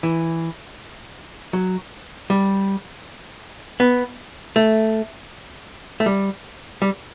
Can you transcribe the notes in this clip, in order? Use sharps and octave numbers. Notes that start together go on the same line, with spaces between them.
E3
F#3
G3
B3
A3
A3
G3
G3